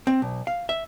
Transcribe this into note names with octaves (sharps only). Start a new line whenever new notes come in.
C4
B1
F5
E5